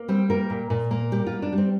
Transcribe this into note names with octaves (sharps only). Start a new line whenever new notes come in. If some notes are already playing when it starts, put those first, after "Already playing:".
Already playing: A#3
G3 C4
A#3 A#4
A#2
A#2
A#3
G3 G4
F4
G3
D4
G3
C4